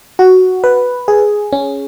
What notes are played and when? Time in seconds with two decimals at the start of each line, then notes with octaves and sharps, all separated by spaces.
0.19 F#4
0.64 B4
1.08 G#4
1.52 C#4